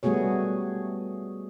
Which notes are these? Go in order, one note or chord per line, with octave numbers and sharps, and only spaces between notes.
G3 A3 B3 F#4 G#4 C#5